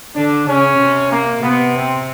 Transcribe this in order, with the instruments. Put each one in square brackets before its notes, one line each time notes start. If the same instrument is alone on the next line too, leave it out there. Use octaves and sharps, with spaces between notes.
[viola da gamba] D3 [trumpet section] D4
[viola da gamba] C#3 [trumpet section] C#4
[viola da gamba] C3
[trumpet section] A#3
[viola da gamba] C3 [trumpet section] B3
[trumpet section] C4